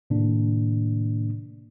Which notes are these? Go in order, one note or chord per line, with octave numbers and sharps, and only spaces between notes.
A2 C3 D#3 A#3 D4